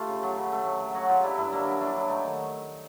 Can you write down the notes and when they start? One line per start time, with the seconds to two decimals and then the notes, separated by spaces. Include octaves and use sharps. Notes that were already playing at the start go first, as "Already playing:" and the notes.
Already playing: A3 F4 G4
0.09 C#3
0.23 F#3
0.37 C#3
0.52 A3
0.66 F#3
0.80 F#3
0.95 F#3 F#4 G#4
1.09 F#3 F4 G4
1.23 F#3 D4 E4
1.37 G2 D4 E4
1.53 A#3 D4 E4
1.66 F#3
1.81 F#3 D4 E4
1.96 F#3
2.10 A3 D#4
2.25 D#3